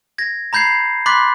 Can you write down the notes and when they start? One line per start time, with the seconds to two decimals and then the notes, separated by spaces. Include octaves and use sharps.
0.18 G#6 A#6
0.53 A#5 B5 G6 G#6 C7
1.06 B5 C6 D6 F#6 A6 B6